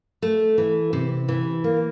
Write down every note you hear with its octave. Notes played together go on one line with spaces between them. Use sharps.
A3
E3
C3
E3
A#3